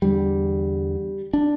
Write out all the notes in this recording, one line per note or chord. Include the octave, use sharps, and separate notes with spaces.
E2 D3 G3
D4